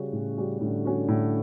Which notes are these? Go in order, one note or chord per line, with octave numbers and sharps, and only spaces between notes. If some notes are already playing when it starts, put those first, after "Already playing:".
Already playing: C#3 G3 C#4 F#4
A2
G3 C#4 F#4
A2 D3
G3 C#4 F#4
A2